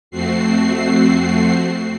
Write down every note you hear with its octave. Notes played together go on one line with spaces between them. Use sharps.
F2 A3 C4 F#4 C7